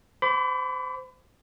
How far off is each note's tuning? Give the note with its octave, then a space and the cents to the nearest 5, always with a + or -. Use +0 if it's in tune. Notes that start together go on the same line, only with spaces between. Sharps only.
C5 -20 B5 +30 D6 -35